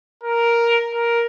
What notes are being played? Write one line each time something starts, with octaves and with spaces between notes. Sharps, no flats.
A#4
A#4